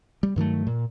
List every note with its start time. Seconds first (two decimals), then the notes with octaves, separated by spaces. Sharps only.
0.23 G3
0.36 G2 D#3 F#3 A3
0.67 A#2